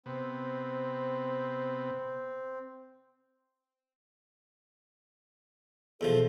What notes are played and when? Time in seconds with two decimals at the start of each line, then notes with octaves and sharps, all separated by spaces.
0.06 C3 B3 C4
6.01 E2 B2 F3 A4